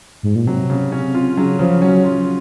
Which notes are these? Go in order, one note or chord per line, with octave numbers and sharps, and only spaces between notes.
G#2
A#2
C3 F#3
C#3
C#4
F4
C#3 F#3
C#3 F3
F#3 C#4
F4